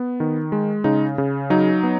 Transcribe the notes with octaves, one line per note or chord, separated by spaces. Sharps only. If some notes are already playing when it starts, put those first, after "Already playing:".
Already playing: B3
D#3
G#3
C#3 D#4
C#3
F#3 D#4
B3